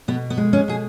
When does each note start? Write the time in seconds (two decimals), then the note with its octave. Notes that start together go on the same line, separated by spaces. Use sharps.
0.08 B2 B3
0.30 B3
0.37 G#3
0.53 C#4
0.68 B2 G#4